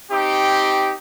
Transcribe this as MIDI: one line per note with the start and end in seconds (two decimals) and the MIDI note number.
0.10 0.93 60
0.10 0.93 63
0.10 0.93 67